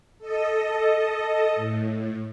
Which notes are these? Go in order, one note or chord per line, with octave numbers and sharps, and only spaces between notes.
A4 D#5
A2